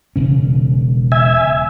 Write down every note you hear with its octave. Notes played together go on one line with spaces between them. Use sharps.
E1 C#3 C#4
E5 G#5